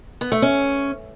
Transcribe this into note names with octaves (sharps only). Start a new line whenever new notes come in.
B3
A3
C#4